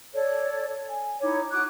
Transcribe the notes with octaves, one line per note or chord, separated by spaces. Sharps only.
A4 C#5 D5
G#5
D#4 E4 C#5 D6
F#4 D6 D#6 F#6